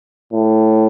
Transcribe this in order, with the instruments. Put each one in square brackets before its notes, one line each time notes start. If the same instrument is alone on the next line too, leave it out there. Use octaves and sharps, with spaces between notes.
[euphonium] A2